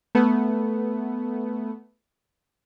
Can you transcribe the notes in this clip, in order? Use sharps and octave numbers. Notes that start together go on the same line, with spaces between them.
A3 B3